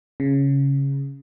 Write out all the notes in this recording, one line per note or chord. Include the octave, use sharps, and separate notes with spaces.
C#3